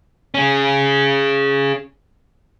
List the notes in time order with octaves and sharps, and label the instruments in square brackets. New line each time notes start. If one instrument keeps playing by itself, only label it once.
[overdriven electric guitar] C#4 G#4